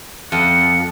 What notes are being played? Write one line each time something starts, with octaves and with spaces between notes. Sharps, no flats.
F2 F#5